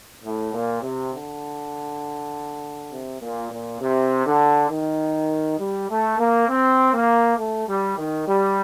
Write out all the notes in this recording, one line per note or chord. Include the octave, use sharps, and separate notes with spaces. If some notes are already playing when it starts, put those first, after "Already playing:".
A2
A#2
C3
D3
C3
A#2
A#2
C3
D3
D#3
G3
A3
A#3
C4
A#3
A3
G3
D#3
G3